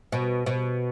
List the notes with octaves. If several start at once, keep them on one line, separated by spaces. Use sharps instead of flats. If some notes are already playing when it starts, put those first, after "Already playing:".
B2
B2